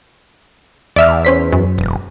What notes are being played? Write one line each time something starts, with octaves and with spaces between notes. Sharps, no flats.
E2 D5 E5 F6
C#4 C5 B6
F#2
E1